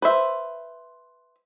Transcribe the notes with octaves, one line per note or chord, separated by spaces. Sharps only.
B4 C5 E5